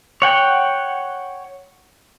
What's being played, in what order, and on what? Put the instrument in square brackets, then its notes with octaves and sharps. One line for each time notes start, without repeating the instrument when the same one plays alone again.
[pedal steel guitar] C#5 F#5 G5